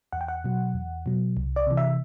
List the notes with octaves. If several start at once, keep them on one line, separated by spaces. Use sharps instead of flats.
E2 F#5
G5
F#5
B2 F#3
E2
B2 F#3
C2
D5
C3 E3
E5